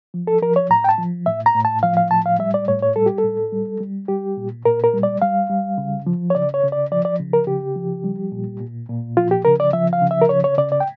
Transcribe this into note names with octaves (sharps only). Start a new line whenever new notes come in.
F3
A4
F3 A#4
C#5
A2 A#5
G5
A5
F3
A2 E5
A#5
A2
A5
F3 F5
F5
A2 A5
F5
G3 E5
D5
A2 C#5
C#5
G3 A4
G4
A4
A2
G3
G3
G3 G4
A#2
A#2 A#4
A#4
G3
D5
G3 F5
G3
C#3
F3
C#5
C#3 D5
C#5
C#3
D5
F3 D5
D5
C#3
A#4
C#3 G4
F3
G3
A#2
A#2
A#2
F3 F4
G4
C#3 A#4
D5
F3 E5
F5
C#3
E5
A#4
C#3 C#5
C#5
C#3 D5
D5
G5